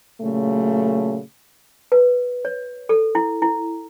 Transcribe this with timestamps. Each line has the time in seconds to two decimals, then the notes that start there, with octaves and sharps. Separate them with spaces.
0.21 A#2 C#3 F#3 A3
1.92 B4
2.45 C#5
2.89 A4
3.15 E4
3.42 E4